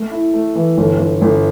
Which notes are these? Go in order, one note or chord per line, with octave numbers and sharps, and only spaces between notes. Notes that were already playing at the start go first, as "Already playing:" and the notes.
Already playing: A3
E4
A3
E3
G1
G1
G1